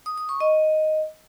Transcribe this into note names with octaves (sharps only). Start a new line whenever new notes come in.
D#6
D#6
C#6
D#5